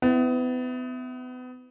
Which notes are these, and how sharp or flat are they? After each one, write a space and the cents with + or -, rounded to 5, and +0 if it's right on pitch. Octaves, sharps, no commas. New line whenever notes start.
B3 +35 E4 +0